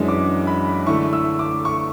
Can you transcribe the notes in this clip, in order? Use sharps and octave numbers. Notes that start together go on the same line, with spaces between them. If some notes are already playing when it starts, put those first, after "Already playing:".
Already playing: F#2 E3 G#3 D4
D6
B5
D3 A3 E4 C#6
E6
D6
C#6